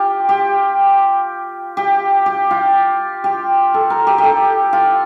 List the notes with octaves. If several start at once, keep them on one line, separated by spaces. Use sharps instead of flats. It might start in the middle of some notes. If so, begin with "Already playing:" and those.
Already playing: F4 G4
G4
G4
G4
F4
G4
A4
A#4
G4
G4
A4
F4